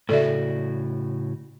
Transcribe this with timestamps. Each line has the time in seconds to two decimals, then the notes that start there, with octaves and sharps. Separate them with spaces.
0.09 A2 C#3 F#4 A4 D5 E5